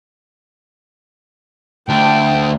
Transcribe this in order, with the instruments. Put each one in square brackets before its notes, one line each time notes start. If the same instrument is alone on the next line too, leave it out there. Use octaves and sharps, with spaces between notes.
[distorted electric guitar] D2 D4 [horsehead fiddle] G5